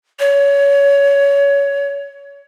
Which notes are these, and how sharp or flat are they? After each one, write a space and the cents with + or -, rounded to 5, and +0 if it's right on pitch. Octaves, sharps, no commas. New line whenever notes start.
C#5 +25